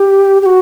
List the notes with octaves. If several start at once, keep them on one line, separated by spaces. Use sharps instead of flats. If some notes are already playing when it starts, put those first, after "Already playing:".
Already playing: G4
G4
F#4